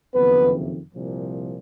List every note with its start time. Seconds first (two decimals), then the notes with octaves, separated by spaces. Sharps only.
0.14 F#1 F2 C3 D#3 B3 B4
0.94 C2 A#2 F3